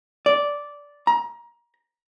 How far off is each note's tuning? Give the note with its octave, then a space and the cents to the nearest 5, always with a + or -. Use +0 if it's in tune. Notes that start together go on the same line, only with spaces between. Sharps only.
D5 -10
A#5 +25